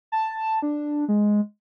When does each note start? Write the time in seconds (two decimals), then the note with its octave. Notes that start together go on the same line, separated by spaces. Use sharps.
0.12 A5
0.62 D4
1.08 G#3